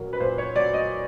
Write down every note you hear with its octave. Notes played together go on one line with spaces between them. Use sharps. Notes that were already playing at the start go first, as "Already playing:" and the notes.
Already playing: A#2 F#3 A#4
B4
A#2 C5
C#5
F#3 D5
D#5